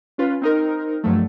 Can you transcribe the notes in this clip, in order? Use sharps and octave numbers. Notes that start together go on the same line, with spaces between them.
C#4 F4 B4
C4 D#4 A#4
G2 F3 F#3 A3